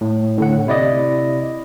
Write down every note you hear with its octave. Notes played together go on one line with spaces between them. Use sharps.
A2
A2 D3 F#5
C3 E4 D5 D#5